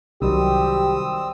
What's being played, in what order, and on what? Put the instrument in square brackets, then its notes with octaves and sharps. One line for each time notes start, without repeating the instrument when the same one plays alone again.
[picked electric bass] C2 [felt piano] D#3 F#3 G3 [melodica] C4 D#6 E6 [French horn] G4